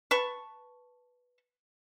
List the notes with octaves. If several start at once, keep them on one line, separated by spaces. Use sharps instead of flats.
B4 A5 C#6